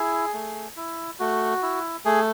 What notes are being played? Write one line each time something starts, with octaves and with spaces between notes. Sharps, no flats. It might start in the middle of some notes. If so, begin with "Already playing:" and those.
Already playing: E4 G#4
A3
E4
A3 F#4
E4
A3 G#4